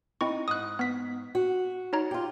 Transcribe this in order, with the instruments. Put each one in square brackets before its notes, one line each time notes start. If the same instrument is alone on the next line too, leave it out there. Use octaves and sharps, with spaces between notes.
[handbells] C4 E4 C#6 [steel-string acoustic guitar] D#4
[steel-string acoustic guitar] G#2 [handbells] D#6 F#6
[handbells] B3 B6
[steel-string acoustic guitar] F#4
[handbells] D#4 C#5 A#5
[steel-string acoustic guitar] F4 G4